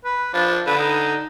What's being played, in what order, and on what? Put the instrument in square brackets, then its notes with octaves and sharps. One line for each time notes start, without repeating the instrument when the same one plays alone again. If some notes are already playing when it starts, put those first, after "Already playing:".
[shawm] B4
[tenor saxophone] F3 [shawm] D4
[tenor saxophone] D3 [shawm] B4
[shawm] D#4